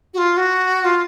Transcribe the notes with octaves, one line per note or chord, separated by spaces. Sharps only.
F#4
F4
F#4
F4